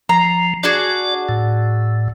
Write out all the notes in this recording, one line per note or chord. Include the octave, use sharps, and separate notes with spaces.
F3 A#5
D4 F#4 G#4 D5
A2